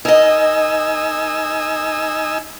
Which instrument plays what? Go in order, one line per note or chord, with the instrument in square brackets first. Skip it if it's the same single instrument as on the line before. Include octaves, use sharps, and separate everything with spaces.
[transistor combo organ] D#4 G#5 E6 [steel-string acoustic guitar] A#4 D#5